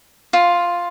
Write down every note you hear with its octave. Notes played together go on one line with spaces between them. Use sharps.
F4